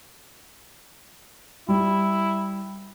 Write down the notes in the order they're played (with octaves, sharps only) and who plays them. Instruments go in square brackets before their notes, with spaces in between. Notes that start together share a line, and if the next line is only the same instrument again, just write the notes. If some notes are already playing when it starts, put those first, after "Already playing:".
[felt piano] G3 [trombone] E4